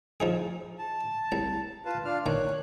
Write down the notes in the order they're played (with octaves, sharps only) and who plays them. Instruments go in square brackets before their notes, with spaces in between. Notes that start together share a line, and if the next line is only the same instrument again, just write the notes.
[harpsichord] F3 D#4 G#4
[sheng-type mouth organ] A5
[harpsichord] C2 A#5
[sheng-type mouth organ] F4 B4 A5
D4 F4 F6
[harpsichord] D#3 A#5 [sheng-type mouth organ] C#5 F#6